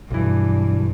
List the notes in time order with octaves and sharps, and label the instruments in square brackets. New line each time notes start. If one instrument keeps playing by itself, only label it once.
[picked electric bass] B1 E3 [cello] G2